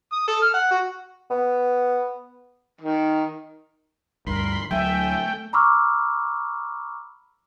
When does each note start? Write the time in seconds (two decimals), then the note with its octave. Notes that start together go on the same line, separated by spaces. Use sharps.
0.12 D#6
0.28 A4
0.42 F6
0.54 F#5
0.71 F#4
1.30 B3
2.81 D#3
4.27 D2 G2 A#4 B5 C6
4.71 D2 F#3 A3 E5 G5 G#5
5.53 A#5 B5 C#6 D6 E6 F6